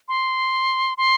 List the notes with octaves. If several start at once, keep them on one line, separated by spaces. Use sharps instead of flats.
C6
C6